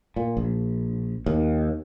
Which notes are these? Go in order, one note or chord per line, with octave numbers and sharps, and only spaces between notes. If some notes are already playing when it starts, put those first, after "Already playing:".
A#2
A#1
D#2